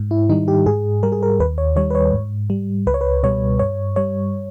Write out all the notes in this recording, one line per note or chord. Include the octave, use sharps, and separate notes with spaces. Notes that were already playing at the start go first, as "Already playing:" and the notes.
Already playing: G#2
E4
D#3 G3 D#4
G4
G#2 G#4
G3 A#4
G#4
A#4
D#2 B4
C#5
D#3 G3 C#5
B4
C#5
G#2
G3
C#2 B4
C#5
B4
B2 G3 C#5
G2 C#5
G3 C#5